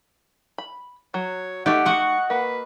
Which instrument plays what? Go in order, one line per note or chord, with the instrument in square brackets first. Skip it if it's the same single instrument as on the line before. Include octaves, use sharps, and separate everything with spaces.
[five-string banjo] B5
[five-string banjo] F#3 [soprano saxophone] C#5
[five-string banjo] A3 D#4 [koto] G4 [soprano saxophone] A4 [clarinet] F#5
[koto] F#4 D#5 [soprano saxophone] C#6
[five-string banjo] A#3 [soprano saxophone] B4